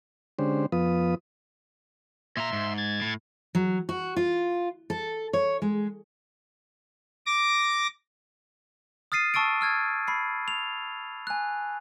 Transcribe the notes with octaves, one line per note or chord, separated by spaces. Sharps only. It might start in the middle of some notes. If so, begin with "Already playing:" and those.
D3 G#3 C#4 D4 G4 C5
F2 F3 B3 F4 B4 D#6
A#2 E5 A#5 C6
G#2
G#6 A6
A2
F#3
F#4
F4
A4
C#5
G#3
D6 A#6
D#6 F6 A6 C7 D#7
A5 C#6 E6 A6 D7
E6 F6 G#6 A6
B5 C7
F7
G#5 F#6